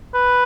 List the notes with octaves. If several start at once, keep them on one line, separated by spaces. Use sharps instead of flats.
B4